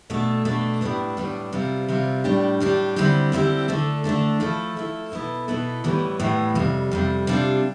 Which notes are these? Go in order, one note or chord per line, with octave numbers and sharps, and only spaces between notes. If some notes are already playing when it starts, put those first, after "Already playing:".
B2 A3 D4 A4
B2 A3 D4 A4
A2 G3 B3 D4
A2 G3 B3 D4
C3 G3 C4 F4
C3 G3 C4 F4
A2 G3 D4 G4
A2 G3 D4 G4
D3 G3 C4 E4 G4
D3 G3 C4 E4 G4
D3 A3 D4 A4
D3 A3 D4 A4
F3 A3 E4 A4
F3 A3 E4 A4
B2 B3 E4 A4
B2 B3 E4 A4
A2 E3 G3 B3
A2 E3 G3 B3
F2 C3 G3
F2 C3 G3
C3 G3 D4 F4